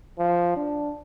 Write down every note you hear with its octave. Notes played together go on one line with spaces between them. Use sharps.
F3
D4